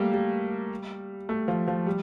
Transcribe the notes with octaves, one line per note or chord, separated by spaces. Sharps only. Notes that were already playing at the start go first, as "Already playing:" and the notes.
Already playing: G3 A3 A#3
G3
A3
F3
F3
G3